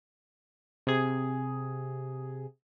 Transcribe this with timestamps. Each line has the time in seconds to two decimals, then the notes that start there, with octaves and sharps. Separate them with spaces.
0.87 C3 G#4